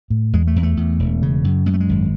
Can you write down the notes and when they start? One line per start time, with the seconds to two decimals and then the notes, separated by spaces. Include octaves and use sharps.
0.10 A2
0.33 E2 G#3
0.47 A3
0.56 E2
0.63 A3
0.77 E2
0.99 E1
1.22 C#3
1.44 F#2
1.66 F#2 G#3
1.74 A3
1.80 G#3
1.89 G#1